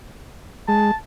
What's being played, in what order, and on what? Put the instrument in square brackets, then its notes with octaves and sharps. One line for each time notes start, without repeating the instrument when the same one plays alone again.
[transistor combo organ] G#3 [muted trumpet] A5